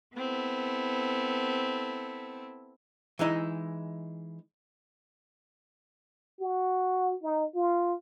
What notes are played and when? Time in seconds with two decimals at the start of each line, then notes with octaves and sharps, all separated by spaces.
0.16 B3 C4 E4 A4
3.19 E3 G#3 D#4 E4
6.40 F#4
7.23 D#4
7.55 F4